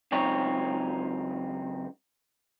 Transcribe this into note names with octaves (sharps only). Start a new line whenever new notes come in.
C#2 F#2 C4 D#4 C#5